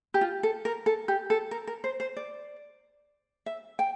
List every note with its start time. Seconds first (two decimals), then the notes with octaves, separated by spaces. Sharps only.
0.14 G4
0.21 F4
0.43 A4
0.65 A#4
0.86 A4
1.08 G4
1.30 A4
1.51 A#4
1.67 A#4
1.84 C5
2.00 C5
2.17 D5
3.46 E5
3.79 G5